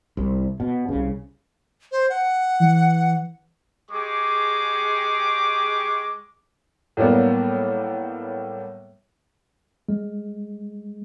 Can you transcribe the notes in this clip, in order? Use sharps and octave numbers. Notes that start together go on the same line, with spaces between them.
C2
B2
C2 C#3
C5
F#5
E3
G#3 G4 G#4 C#6 D6
A2 F#3 G3 A#3 B3
G#3